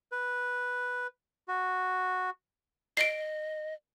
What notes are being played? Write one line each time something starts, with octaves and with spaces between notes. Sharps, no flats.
B4
F#4
D#5 C7 D7